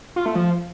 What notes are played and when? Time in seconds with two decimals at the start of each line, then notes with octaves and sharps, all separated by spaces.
0.16 F4
0.26 A3
0.35 F3